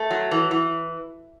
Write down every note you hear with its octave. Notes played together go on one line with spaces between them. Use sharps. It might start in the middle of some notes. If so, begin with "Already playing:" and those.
Already playing: A3
F#3
E3
E3